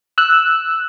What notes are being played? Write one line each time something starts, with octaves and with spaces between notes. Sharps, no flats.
E6 F#6